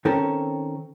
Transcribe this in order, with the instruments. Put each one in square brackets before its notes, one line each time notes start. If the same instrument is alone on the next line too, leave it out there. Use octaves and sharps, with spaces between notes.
[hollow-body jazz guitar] D#3 C4 C#4 A4 A#4